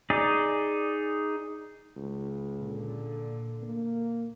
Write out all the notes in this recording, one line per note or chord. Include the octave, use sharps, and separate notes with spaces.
D#4 G#4 D5
C#2
A#2 D3
A#3